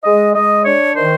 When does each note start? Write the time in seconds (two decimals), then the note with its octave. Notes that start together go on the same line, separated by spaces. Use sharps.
0.04 G#3 D#5
0.35 G#3 D#5
0.65 D4 C#5
0.96 D#3 C5